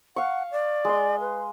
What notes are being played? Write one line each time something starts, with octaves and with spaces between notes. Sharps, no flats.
F5 F#5 C#6
D5
G#3 D#5 C6
B4